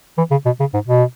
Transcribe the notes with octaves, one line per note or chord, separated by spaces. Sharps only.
E3
C#3
B2
C#3
G#2
B2